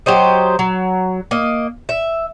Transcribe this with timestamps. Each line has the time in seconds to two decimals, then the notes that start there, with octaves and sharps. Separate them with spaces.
0.06 F#3 G4 C5 D#5
0.59 F#3
1.31 A#3 D#5
1.89 E5